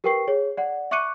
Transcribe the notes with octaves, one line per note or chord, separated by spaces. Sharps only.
G4 A#4 B4 G5 C#6 C7
G#4 C#5
D5 F#5
E5 C#6 D6 F#6 C#7 D#7